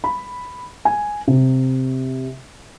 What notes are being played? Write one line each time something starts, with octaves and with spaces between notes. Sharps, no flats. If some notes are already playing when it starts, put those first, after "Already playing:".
B5
G#5
C3